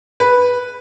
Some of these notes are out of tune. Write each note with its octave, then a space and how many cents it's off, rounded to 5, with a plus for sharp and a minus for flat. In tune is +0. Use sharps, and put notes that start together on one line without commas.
B4 -5